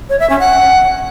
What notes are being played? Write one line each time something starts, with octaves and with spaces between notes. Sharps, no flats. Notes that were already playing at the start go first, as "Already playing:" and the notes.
C#5
E5
C#4
F#5